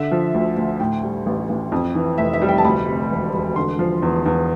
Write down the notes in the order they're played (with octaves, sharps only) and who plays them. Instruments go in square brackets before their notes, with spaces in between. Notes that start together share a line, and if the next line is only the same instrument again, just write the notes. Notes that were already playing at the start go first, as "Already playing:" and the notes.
Already playing: [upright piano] D3 E5
F3
D2
D2
A2 G5
G3
A1
A1
F2
E3
F1 E5
E5
G3
G5
A5
D2 B5
C3
E1
E1
D3 C6
F3
E2
E2